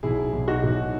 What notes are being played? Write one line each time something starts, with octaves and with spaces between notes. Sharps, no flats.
B1 E4 G#4
B1
D#4 F#4
B1